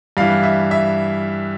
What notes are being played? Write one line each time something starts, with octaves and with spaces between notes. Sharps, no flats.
G2 E3 F5
E5
E5